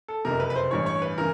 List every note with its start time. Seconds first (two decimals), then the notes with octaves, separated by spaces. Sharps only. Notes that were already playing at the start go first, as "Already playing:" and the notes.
0.08 A4
0.25 F#1 F2 C3 A#4
0.40 B4
0.50 B4
0.55 C5
0.71 A1 G2 E3 C#5
0.86 C#5
1.02 B4
1.18 C#3 E3 A#4